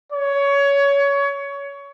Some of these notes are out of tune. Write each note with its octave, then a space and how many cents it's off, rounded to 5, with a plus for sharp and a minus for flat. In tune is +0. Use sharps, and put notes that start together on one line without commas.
C#5 +20